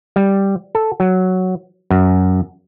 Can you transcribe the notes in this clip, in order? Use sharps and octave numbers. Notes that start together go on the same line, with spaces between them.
G3
A4
F#3
F#2